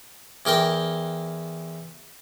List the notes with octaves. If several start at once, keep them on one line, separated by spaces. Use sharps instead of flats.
E2 G4 A#4 G5